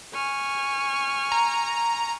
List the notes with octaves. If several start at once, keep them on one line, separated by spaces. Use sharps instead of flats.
G#5 C#6 F6
A#5